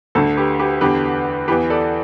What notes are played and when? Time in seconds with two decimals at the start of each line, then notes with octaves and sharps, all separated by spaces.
0.15 D2 D3 A4
0.37 G4 B4
0.59 G4 B4
0.81 E2 D3 G4 B4
1.48 E2 E3 G4 B4
1.70 A4 D5